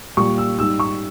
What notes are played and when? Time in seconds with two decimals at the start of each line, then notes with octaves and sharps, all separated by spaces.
0.17 A#2 G3 C#6
0.38 E6
0.59 G#2 G3 E6
0.80 C#6